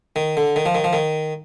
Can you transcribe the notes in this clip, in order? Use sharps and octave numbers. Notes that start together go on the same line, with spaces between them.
D#3
D3
D#3
F3
D#3
F3
D#3